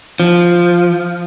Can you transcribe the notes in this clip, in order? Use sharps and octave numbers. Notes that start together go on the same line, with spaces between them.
F3